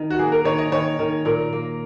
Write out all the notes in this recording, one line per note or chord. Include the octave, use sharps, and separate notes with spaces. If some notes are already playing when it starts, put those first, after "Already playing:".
Already playing: D#3 D#4
F#4
A#3 G#4
A#4
D#3 C#5
D#5
D#3 C#5
D#3 A#4
A#2 A#4
A#3